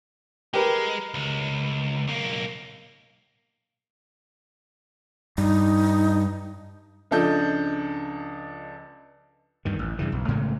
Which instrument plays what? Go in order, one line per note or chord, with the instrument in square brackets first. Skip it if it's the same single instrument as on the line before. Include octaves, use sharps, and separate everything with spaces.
[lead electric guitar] G#3 [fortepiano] G4 A#4 B4
[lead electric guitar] C#2
B1 A#3
[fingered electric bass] G2 [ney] D#4
[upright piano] C#2 F3 D4 A4 D#5 G6
[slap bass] D2 G2 D#3
A1
G2 C#3 E3
B1
A2 C#3 G#3 A3